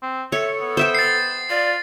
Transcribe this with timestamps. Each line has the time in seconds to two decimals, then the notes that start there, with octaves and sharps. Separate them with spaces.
0.02 C4
0.32 A4 C#5 E5
0.60 B3
0.77 C5 E5 G5
0.95 A6 C7
1.50 F4 D5